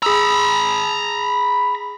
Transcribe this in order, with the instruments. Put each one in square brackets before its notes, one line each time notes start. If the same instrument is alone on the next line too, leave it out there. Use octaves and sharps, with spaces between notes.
[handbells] G#4 E6 [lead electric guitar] A#5 B5